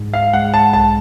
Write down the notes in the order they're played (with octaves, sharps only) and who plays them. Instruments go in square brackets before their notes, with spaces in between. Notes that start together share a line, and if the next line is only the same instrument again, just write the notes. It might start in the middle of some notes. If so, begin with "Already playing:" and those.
Already playing: [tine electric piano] G#2 G#3
[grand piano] F5
[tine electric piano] G#3 [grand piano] F#5
[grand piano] A5
[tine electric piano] B1 [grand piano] A5